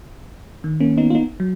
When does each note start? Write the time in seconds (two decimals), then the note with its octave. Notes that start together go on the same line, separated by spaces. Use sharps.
0.64 D#3
0.80 A#3 C#4
0.98 B3 D#4
1.10 F4
1.15 B3 D#4
1.40 F#3